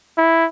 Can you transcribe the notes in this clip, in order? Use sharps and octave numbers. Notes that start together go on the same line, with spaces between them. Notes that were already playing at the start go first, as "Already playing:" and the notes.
E4